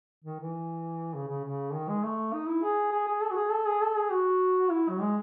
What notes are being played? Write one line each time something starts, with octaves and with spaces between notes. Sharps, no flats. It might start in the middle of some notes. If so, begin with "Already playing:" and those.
D#3
E3
C#3
C#3
C#3
D#3
G#3
A3
D#4
E4
G#4
G#4
G#4
A4
F#4
G#4
A4
G#4
A4
G#4
F#4
E4
F#3
G#3